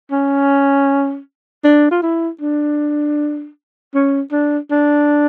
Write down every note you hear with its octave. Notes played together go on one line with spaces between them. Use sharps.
C#4
D4
F4
E4
D4
C#4
D4
D4